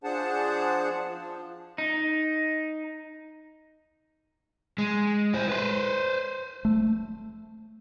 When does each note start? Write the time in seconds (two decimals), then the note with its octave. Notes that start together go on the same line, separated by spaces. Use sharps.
0.04 F3 D4 G#4 C5 F#5 A5
1.06 F3
1.78 D#4
4.78 G#3
5.34 E4 C5
5.49 B4 C5
6.65 A3